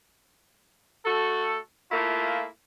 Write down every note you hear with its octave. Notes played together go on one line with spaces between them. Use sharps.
A3 F#4 A4
A3 A#3 E4 F4